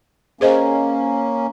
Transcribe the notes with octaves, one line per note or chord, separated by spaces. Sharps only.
A#3 C#4 G#4 C5 D#5